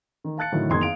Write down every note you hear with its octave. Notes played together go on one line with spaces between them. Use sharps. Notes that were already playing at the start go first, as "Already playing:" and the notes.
D#3
F5 A5 F#6 A6 C#7
A2 D3 D#3 F#3
F#1 E2 D#3 C6 D#6 G#6
F5 D7 F7